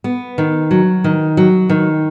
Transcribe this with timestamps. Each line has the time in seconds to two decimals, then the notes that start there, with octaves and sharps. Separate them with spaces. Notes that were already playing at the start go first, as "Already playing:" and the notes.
0.04 B3
0.38 D#3
0.71 F#3
1.04 D#3
1.37 F#3
1.69 D#3